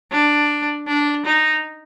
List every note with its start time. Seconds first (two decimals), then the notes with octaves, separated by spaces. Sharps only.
0.12 D4
0.87 D4
1.25 D#4